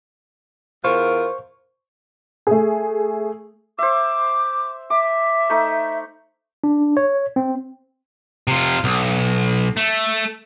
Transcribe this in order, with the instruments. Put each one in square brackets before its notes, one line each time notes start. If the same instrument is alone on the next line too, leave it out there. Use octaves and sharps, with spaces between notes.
[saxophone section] E2 F4 A#4 [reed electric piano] C5 C#6
[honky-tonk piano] A3 G#4
[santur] C5 E5 [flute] D6
[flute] E5 [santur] D6
[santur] A3 D#4
[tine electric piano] D4
C#5
C4
[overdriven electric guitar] C3 F4
B1
A3